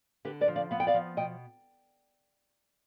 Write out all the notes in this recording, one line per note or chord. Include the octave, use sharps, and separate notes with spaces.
D3 G4 B4
B4 D5
F3
D5 F5
B3 F5
G5
D5 F5
F3
B2 D#5 G5